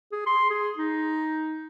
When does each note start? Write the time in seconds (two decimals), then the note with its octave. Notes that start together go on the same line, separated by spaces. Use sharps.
0.12 G#4
0.26 C6
0.50 G#4
0.78 D#4